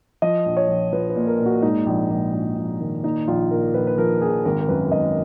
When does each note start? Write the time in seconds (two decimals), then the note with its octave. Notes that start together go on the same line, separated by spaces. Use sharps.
0.22 F3 D#5
0.46 A#1
0.57 C#5
0.68 A#1
0.92 F3 B4
1.10 B4
1.16 A#2
1.27 A#4
1.39 A#2
1.46 F#4
1.62 G#2 D#4
1.86 A#1
2.10 A#1
2.33 A#1
2.56 A#1
2.80 D#3
3.03 A#2 D#4
3.28 A#1 F4
3.51 A#2 A#4
3.74 A#1 B4
3.87 B4
3.97 F3 A#4
4.22 A#1 G#4
4.45 G#1 A#4
4.60 A#4
4.68 F#2 B4
4.91 G#1 D#5